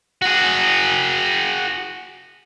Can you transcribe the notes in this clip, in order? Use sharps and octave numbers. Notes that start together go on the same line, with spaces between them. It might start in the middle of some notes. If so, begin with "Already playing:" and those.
F#4 G#4